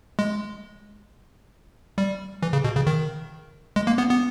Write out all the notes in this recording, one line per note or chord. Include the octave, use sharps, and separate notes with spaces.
G#3
G3
E3
C#3
B2
C#3
D#3
G#3
A#3
B3
B3